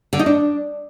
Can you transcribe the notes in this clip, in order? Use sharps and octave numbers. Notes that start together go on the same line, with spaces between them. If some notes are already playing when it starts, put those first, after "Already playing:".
D3
D#4
D4